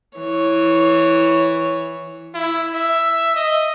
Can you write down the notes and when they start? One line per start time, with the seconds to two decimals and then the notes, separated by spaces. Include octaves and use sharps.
0.18 E3 C#5
2.34 E4
2.74 E5
3.36 D#5